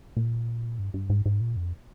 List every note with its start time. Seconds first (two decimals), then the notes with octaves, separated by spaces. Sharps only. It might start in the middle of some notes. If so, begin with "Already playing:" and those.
0.17 A#2
0.79 G2
0.94 G2
1.10 G#2
1.26 G#2
1.41 A#2
1.56 F2